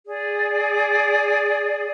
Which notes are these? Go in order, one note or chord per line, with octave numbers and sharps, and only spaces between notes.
G#4 D5